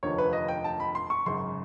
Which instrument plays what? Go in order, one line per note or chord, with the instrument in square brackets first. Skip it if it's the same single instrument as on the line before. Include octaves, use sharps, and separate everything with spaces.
[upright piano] F1 D#2 D3 F3 C#5
B4
D#5
G5
A5
B5
C6
C#6
G#1 F#2 C#3 C6